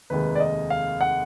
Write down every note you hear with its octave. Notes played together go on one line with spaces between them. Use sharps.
F1 D#2 D#3 G#3 B4
D5
D#5
F5
F#5